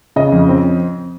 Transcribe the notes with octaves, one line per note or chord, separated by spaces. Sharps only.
C#3 D#5
F2
C4